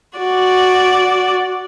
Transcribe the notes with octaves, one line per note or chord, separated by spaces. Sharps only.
F#4 D5